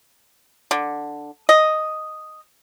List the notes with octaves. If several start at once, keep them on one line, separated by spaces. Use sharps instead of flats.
D3
D#5